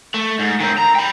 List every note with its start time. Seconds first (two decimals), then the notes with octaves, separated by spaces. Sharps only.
0.14 A3
0.39 G#2
0.60 D#3 C4
0.78 A#5
0.95 G5 B5